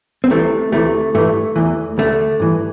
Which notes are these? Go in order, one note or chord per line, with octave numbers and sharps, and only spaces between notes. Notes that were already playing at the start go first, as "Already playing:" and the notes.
C4
C2 C3 E3 A3
D2 C3 E3 A3
G2 E3 A3
E2 E3
D2 D3 A3
G2 E3